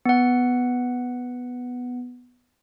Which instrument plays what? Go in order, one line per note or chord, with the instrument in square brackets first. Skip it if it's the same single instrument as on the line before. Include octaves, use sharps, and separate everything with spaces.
[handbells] B3 F#5